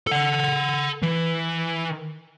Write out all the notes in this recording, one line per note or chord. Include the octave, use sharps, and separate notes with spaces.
A4 F#5
E3